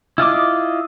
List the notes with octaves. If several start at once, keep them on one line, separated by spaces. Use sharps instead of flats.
E4 F4 D#5 D6